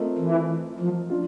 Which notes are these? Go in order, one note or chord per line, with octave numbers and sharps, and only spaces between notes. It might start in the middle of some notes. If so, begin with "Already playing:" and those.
Already playing: A3 C4 F4 A#4 D#5
E3
F3
D4 F4